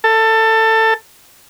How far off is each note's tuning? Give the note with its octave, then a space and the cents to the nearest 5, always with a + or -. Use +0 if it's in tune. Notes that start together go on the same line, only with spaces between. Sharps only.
A4 +20